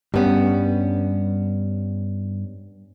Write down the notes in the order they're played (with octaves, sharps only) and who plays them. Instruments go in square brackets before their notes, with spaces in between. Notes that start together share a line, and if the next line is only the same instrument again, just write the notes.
[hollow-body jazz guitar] G2 C#4 [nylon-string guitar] G3 B3